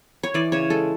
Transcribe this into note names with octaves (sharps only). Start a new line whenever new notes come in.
C#5
E3 D5
C#3 C#5
G#3 A4